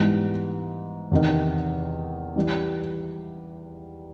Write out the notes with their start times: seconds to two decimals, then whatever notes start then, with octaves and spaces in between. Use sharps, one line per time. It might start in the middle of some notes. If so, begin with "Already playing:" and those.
Already playing: G#2 E3 G3 B3
1.11 E2 C3 D#3
2.36 E3 G3